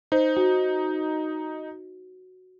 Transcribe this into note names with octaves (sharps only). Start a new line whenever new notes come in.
D#4 C5
F#4